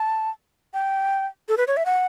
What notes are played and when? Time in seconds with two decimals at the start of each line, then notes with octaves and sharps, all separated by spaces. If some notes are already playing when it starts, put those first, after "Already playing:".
Already playing: A5
0.74 G5
1.49 A4
1.58 B4
1.68 C#5
1.77 E5
1.86 F#5